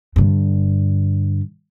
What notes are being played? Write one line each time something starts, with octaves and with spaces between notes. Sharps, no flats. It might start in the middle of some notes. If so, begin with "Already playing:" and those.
G2 D3